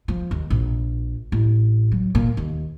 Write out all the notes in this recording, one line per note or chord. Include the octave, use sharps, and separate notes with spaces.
F3
D#2
A#1
A1
F#3
A#2
D#2